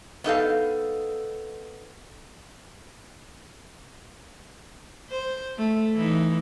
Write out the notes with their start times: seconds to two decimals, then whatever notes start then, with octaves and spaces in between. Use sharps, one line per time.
0.24 B3 D#4 A4 F5
5.09 C5
5.58 A3
5.94 E3 D#4